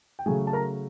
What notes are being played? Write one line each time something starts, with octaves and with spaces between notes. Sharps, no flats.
G5
C#3 F#3 A3 G#4 G#5
A5
A#4 A#5